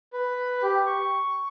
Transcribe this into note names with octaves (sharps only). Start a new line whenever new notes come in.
B4
G4
C#6